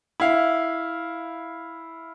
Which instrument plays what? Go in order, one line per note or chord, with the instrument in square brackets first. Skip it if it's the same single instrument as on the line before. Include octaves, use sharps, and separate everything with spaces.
[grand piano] E4 F5